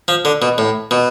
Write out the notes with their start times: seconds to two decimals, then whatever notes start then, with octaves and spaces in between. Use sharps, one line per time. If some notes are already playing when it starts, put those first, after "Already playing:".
0.08 F3
0.25 D3
0.42 B2
0.58 A2
0.91 B2